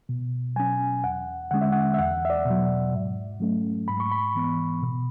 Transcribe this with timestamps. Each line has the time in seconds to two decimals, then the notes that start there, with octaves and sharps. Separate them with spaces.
0.09 B2
0.56 F#3 C#4 G#5
1.04 E2 F#5
1.51 D3 G#3 C#4 F#5
1.62 E5
1.72 F#5
1.94 E5
1.99 E2 F#5
2.25 E5
2.30 D5
2.46 B2 F#3
2.93 G#2
3.40 F#3 A3 C#4
3.88 G#2 B5
4.00 C#6
4.12 B5
4.35 E3 B3
4.83 B2